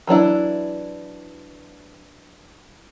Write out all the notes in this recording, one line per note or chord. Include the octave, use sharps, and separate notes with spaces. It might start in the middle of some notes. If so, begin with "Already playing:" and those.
E3 F#3 D4 E4